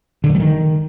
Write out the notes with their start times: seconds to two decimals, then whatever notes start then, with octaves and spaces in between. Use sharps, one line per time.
0.24 D3
0.29 G2
0.35 G3
0.40 D#3